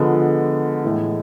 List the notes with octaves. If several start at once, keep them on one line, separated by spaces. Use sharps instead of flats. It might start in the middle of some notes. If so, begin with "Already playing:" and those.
Already playing: D3 F3 G#3 B3
A2 E3 G#3